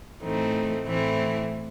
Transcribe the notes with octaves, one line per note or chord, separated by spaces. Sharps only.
A2 E3 A3 C4 D#4
A2 E3 A3 C4 E4